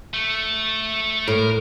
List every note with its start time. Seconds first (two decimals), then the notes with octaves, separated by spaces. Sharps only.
0.14 A3
1.28 A2 A#4